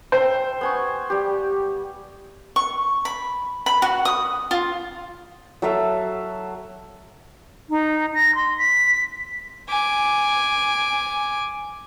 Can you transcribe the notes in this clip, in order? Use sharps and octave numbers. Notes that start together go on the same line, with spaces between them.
C5 E5 G5
B3 G#5 C#6
G3 G4
C#6
B5
B5
F#4
D#6
F4
F#3 A4 E5 F5
D#4
A#6
C6
B6
G#5 D6